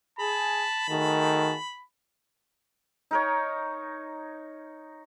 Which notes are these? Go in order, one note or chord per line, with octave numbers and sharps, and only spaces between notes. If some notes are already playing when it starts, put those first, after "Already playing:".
G#4 A5 B5
D#3 A3 F#4 G#4 A5
D#4 A#4 C#5